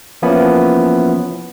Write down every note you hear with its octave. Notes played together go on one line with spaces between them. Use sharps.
E3 F3 A#3 B3 C#4 E4